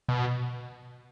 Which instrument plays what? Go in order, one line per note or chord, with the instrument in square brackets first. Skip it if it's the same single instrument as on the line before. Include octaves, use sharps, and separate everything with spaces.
[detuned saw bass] B2